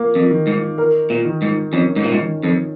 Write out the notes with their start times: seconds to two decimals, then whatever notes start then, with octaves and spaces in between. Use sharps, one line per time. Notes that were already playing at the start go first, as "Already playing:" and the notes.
Already playing: A#3
0.15 F2
0.31 D#3
0.47 G#2
0.78 A#4
1.10 A#2
1.25 D#3
1.42 G#2
1.73 F2 C#4
1.96 G#2
2.04 A#2
2.12 G#2
2.20 D#3
2.43 F2